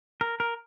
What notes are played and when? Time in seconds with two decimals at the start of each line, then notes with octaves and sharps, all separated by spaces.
0.21 A#4
0.40 A#4